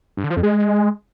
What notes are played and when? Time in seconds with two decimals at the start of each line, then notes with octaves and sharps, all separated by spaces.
0.17 G2
0.24 D3
0.30 F3
0.37 F2
0.43 G#3